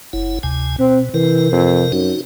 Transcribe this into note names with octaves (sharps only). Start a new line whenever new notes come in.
F#1 E4
D2 C3 G#5
B2 C4
C3 E3 A#4
F2
F#2 D#4 F#4